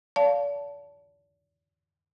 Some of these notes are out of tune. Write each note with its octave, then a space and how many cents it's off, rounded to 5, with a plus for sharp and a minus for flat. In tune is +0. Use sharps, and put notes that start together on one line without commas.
D5 -40 F5 +0 A5 +0